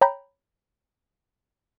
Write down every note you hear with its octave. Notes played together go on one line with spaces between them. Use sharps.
C#5 G5 A#5 B5 G6